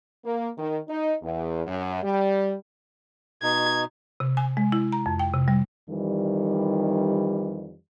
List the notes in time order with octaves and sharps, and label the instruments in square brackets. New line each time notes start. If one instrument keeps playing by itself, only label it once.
[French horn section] A#3
D#3
D#4
E2
F#2
G3
[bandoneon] B2 D#4 [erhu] G#6
[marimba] C3
G#5
G#3
E4
A#5
F2
G5
C3
G3
[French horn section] F2 D#3 E3 G3